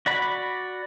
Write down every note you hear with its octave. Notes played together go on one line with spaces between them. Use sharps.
F#4 D5 B5